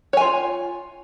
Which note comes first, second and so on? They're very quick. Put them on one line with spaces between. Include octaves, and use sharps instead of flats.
C#5 G#5 F4